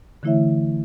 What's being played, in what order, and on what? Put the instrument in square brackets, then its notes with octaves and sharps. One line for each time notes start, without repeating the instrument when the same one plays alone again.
[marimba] D3 E3 A3 E4 C#5 E5